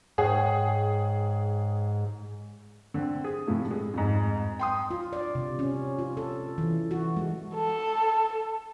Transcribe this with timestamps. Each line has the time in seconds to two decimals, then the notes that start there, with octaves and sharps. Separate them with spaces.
0.18 G#2 G#4 C#5 F#5 G5
2.94 D3 C4
3.24 G#4
3.47 A2 C3 F3 A3
3.71 G#3
3.94 F2 G#2
4.59 G5 C6 D#6
4.91 F4
5.13 D5
5.35 C3
5.59 C#4
5.98 F4
6.17 A4
6.58 E3
6.91 F#4
7.17 G#3
7.55 A4